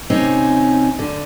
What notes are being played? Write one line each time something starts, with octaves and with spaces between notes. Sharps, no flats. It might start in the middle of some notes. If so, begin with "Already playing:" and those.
C3 C4 C#4 D#4
D3